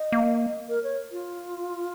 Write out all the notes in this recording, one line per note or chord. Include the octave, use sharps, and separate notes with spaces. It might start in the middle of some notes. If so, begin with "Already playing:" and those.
Already playing: D#5
A#3
A#4
C#5
F4